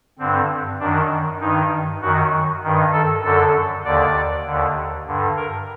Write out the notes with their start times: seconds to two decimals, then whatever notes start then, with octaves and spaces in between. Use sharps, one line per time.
0.19 G2 D3 C4
0.80 F#2 D#3 D4
1.40 G2 D#4
1.46 D#3
2.01 F#2 D#3 F#4
2.63 G2 D#3
2.93 A4
3.23 F#2 D3 A4
3.84 D#2 D3 D5
4.46 D#2 D3
5.07 G2 D3
5.36 A#4